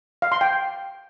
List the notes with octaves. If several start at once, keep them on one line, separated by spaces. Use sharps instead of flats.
F5
C6
G5